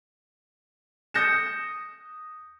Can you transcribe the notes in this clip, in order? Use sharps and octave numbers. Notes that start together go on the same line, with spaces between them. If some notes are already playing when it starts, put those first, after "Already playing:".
D#6 G6 A#6 C#7 E7